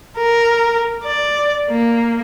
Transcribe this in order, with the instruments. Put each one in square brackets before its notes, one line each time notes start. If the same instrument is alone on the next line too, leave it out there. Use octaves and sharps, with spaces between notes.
[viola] A#4
D5
A#3